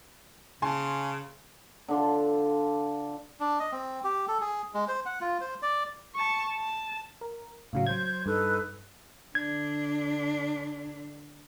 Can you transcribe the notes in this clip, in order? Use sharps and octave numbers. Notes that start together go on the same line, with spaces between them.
C#3 G#5 A5 C6
D3 D4 F4
D4
D#5
C4
G4
A4
G#4
G#3
C5
F#5
F4
C5
D5
A5 C#6
A5
A#4
A2 C#3 F#3 F5
F#3 C5 G6 G#6
G2 D#4 A4 B4
D3 D4 G#6